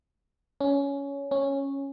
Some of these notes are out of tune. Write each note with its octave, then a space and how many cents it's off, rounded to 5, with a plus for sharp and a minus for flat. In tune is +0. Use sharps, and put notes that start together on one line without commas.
C#4 +15
C#4 -10